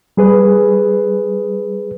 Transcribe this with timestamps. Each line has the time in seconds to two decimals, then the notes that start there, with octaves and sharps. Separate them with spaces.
0.17 G3 G#4 B4